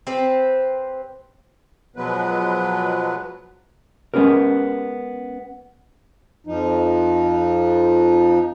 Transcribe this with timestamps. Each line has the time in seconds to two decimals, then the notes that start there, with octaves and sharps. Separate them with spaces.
0.07 C4 G4 B4 C5
1.96 B2 F3 F#3 G#3 B3 B4
4.14 G#3 A3 B3 C#4 G4 A#4
6.47 F2 F3 D#4